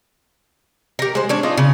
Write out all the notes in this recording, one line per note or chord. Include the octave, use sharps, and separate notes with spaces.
G4 A#4
G#3 C5
C#4 D4 C#5
D4 D#4 F4
C#3